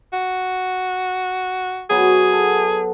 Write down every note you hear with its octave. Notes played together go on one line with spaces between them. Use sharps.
F#4
F#3 B3 G#4
A4